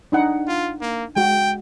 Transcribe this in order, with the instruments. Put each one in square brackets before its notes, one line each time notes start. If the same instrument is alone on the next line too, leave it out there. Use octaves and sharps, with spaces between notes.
[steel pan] D4 D#4 F#5
[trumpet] F4
A#3
[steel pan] G#3 F#4 [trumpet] G5